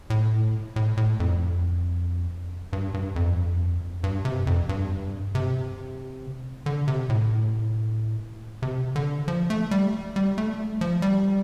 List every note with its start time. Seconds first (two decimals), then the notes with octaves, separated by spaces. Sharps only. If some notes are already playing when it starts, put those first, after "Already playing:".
0.10 A2
0.76 A2
0.97 A2
1.20 F2
2.73 G2
2.94 G2
3.16 F2
4.04 G2
4.25 C3
4.47 F2
4.69 G2
5.35 C3
6.66 D3
6.88 C3
7.10 A2
8.62 C3
8.96 D3
9.28 F3
9.50 A3
9.71 G3
10.16 G3
10.38 A3
10.81 F3
11.02 G3